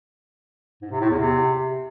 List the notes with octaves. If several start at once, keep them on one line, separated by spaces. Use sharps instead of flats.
G#2
C3
A2
E2
C3